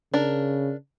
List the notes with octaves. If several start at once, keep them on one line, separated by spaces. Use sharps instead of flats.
C#3 D4 A#4